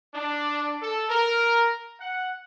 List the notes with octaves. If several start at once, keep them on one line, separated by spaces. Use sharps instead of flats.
D4
A4
A#4
F#5